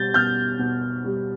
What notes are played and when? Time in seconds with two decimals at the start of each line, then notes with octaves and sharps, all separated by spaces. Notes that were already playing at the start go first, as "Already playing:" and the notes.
Already playing: B2 G3 G6 A6
0.14 B2 F6 G6
0.59 B2
1.05 G3